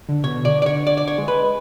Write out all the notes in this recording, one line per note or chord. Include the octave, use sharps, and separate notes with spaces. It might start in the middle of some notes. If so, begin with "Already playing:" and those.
D3
B2 C#5
D3 D5
D5
D3 C#5
D3 D5
D5
C#5
G#3
B4